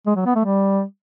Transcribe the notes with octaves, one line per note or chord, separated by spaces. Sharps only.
G#3
F#3
B3
A3
G3